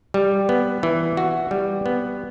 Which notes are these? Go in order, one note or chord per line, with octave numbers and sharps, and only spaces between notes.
G3
B3
E3
F#4
G3
B3